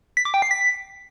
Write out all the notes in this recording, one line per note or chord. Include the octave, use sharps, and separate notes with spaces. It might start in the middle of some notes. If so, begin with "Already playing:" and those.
B6
D6
G5
C7
B6